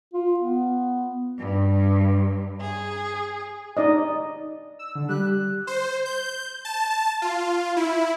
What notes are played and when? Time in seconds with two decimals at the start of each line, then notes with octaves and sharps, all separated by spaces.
0.14 F4
0.40 B3
1.38 G2
2.60 G#4
3.77 D#4 D5 D#5
4.79 E6
4.95 D3
5.09 G3 F#6
5.67 C5
6.05 G6
6.65 A5
7.22 F4
7.77 E4